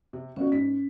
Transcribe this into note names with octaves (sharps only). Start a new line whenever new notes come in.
C3
G1 C4 C#4 F#4
G#2 B6